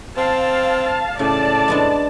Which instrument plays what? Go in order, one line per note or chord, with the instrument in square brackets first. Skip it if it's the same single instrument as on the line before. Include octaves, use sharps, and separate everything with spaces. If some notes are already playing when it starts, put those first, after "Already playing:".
[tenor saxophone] C4 [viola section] F5 A5
[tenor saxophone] A2 [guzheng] C#3 [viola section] D5 A5
[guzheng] G#3 B3 D4